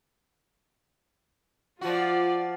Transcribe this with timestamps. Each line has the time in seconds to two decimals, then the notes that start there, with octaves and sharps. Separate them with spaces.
1.81 F3 F4 F#4 D5